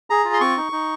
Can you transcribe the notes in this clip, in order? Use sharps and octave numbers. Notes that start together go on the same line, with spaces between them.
G#4 A#5
F4
C6
C4 C#6
D#4
D#4